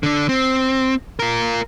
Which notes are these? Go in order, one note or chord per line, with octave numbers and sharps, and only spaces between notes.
D3 D4
C4
F4 A#4